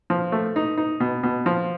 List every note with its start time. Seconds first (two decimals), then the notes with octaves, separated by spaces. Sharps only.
0.10 F3
0.32 A3
0.56 D#4
0.77 D#4
1.00 B2
1.23 B2
1.46 F3